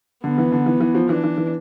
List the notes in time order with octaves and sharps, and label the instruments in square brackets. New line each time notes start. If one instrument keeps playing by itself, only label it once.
[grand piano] D3 [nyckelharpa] B3
[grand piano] E3
D3
E3
E3
F3
[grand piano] E3 [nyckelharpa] D4
[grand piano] E3
E3